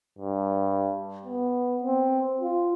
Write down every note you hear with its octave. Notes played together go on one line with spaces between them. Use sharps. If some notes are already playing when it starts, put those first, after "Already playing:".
G2
B3
C4
F4